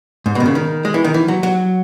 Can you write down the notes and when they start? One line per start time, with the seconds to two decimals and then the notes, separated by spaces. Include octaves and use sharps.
0.26 G#2
0.35 B2
0.40 D#3
0.46 C#3
0.55 D#3
0.85 G#3
0.94 E3
1.05 D#3
1.14 E3
1.28 F#3
1.43 F#3